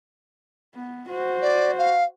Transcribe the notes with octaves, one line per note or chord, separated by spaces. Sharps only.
B3
F#4 C5
D5
F5